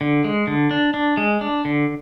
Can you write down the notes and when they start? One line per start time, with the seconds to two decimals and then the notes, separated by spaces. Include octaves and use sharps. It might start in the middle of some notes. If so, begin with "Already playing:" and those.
0.01 D3
0.24 G#3
0.47 D3
0.71 D4
0.94 D4
1.17 G#3
1.41 D4
1.65 D3